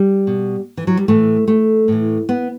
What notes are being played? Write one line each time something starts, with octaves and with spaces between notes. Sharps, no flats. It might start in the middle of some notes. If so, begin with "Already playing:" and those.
Already playing: G3
B2
E3
F#3
G3
A2 E3 A3
A3
A2 E3
B3